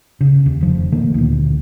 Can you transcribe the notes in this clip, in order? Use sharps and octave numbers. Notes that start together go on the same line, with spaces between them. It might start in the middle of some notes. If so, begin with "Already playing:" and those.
C#3
D#2
F1 F3
B2 D#3 A3 A#3
D2 A#2